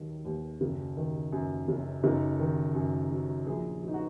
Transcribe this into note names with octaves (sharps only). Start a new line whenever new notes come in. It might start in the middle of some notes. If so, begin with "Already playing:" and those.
Already playing: D#2 D#3 F#3
D#2
F#1
D#3
F#2
F#1
F#1 D#4
D#3
F#2
F#3
A#1 G#4
F#3
D#4
F#4